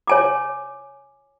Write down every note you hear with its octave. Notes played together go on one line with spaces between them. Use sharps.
C#5 G#5 D6